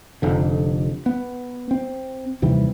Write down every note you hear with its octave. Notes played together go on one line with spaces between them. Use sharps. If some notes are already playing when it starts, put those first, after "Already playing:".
F1 F2 D3
B3
C4
D#2 C3 E3 G3